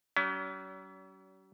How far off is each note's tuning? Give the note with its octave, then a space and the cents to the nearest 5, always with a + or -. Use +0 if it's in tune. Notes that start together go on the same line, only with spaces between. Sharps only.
F#3 +45 C#4 +40